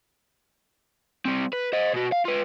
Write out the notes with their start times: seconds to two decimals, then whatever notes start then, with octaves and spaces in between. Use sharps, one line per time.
1.25 G3 C4
1.53 B4
1.73 C5 D#5
1.94 B2 F#4
2.12 F5
2.25 F4 B4